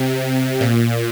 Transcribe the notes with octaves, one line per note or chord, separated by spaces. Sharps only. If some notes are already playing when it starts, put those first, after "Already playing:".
Already playing: C3
A#2